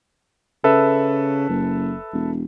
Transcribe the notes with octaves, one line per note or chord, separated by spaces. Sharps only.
C#3 A4 B4 E5
F#1
E1